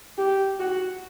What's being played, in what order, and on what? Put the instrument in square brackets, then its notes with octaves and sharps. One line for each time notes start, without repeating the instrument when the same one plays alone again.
[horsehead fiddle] G4
F#4